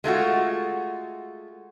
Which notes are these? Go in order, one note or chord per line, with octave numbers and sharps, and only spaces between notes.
G#3 A3 F4 F#4